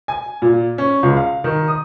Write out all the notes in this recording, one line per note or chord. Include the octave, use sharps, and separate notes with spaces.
G#5
A#2
C#4
C#2
F5
D#3
D#6